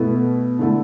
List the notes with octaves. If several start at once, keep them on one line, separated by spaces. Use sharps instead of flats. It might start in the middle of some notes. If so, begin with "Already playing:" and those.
Already playing: B2 A3 E4
D3 A3 E4 A4